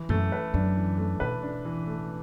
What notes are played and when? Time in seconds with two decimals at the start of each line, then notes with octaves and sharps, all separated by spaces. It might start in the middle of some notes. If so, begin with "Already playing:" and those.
Already playing: E3
0.09 F#2 A3
0.32 B4
0.54 F#2 D4
0.77 E3
0.98 A3
1.20 B2 B4
1.43 D4
1.65 E3
1.87 A3